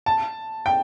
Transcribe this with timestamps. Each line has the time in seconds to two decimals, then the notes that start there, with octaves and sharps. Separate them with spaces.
0.06 A5
0.66 G5